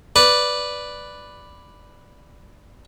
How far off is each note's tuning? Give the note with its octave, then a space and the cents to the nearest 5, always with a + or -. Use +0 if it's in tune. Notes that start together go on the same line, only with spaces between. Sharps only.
B4 +0 D5 +0